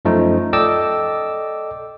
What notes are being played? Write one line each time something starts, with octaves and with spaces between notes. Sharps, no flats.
F#2 F3 A3 D#4
A4 D5 D#5 G5 D6 E6